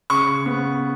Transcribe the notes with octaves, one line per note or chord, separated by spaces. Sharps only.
C#3 C#6
B3